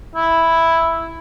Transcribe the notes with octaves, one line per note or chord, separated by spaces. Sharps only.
E4